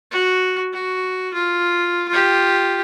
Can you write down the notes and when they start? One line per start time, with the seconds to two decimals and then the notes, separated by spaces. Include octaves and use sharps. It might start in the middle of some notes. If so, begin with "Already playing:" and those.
0.11 F#4
0.73 F#4
1.34 F4
2.09 F4 G4